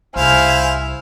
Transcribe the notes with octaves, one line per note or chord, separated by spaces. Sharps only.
C2 E4 C5 F5 G#5 F6